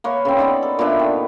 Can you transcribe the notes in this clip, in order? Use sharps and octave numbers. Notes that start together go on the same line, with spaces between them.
A#3 B4 C#5
C#3 C4
A#3 B3 D#4 D5
A4
A#2 B3 D4 E5
D#3